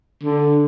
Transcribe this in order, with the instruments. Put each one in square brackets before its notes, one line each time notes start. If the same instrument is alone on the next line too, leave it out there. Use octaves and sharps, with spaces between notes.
[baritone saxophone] D3